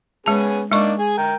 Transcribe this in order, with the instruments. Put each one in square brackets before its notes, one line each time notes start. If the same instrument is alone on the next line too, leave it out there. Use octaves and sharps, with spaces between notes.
[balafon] G#3 A5 [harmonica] B3 C#4 G#4
[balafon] G#3 C#6 [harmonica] A#3 D4 D#4
[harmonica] G#4 G#5
A#4 G5